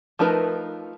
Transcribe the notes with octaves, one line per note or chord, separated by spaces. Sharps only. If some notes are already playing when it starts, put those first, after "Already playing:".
F3 A3 D#4 A#4 B4